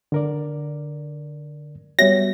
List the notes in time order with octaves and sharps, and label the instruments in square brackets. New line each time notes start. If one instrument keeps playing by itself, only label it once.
[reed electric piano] D3 A#4 D5
[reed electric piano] G3 B3 F#4 [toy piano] C#5 E5 [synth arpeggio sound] A#6